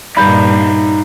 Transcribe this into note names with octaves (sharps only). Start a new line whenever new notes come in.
G2 A#2 D#4 D5 F5 B5 G6